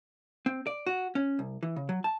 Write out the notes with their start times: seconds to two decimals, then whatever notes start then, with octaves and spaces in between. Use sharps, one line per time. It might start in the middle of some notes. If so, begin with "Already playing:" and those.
0.46 C4
0.67 D5
0.86 F#4
1.15 C#4
1.39 C2
1.63 E3
1.76 C#3
1.89 F#3
2.04 A5